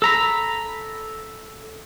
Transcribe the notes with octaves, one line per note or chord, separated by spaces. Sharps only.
A4 A#5 B5